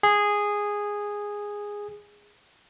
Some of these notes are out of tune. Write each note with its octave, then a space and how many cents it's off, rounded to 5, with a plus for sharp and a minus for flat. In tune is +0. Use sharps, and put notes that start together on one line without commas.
G#4 -10